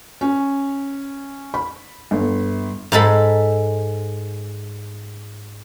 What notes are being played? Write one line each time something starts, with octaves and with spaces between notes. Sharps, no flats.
C#4
B5
G1
G#2 G#3 A4 B5